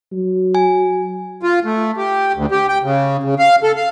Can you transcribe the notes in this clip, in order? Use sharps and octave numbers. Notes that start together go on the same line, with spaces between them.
F#3
G#5
F4
A3
G4
D2
G4
G5
C#3
C#3
F5
A4
F5